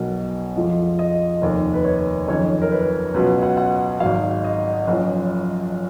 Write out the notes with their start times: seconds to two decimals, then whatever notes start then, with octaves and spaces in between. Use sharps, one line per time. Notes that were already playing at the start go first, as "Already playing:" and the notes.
Already playing: B1 B2 F#3 A#4
0.56 F2 F3 G#3
0.99 D#5
1.42 F1 D#2 D#3
1.74 B4
1.84 C#5
2.27 F#1 F2 D#3 C#5
2.61 A#4
2.71 B4
3.14 C#2 B2 F#3 B4
3.42 F#5
3.57 F#5
4.00 G#1 G#2 F#3 F5
4.44 D#5
4.87 F#1 F#2 F3